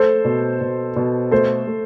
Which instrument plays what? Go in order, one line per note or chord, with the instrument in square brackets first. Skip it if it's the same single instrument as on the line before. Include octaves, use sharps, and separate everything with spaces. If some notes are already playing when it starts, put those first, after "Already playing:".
Already playing: [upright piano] A3 [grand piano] A4 C5
[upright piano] B2
B2
B2
[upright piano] A3 [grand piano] A4 C5
[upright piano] A3